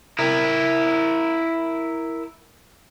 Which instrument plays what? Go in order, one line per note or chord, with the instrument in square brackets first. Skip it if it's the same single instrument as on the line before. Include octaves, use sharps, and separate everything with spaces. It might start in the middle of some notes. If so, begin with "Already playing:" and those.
[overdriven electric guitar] E4 A#4